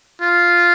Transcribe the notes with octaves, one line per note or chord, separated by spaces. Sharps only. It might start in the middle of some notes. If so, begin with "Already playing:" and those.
F4